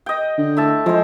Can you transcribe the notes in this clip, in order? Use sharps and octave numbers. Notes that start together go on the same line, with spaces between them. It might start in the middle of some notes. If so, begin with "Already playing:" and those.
D#5 G5
D3
A2 E5 A5
F3 G#3 C5